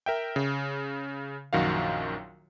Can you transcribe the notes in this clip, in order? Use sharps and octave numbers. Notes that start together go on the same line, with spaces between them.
A#4 E5 G5
C#3
A#1 F#2 D#3 F#4 F5